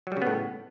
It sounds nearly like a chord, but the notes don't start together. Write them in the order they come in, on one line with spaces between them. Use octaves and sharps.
F#3 G3 C#3 B3 A2